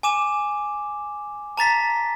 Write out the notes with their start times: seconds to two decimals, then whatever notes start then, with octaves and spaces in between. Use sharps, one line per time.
0.03 G#5 D6 E7
1.57 A5 A#5 A6 B6